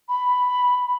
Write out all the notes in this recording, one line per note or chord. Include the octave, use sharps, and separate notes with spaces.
B5